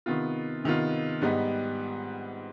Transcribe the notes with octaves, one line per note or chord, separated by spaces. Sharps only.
C3 D#3 B3 F4
C3 D#3 B3 F4
G#2 G3 B3 D#4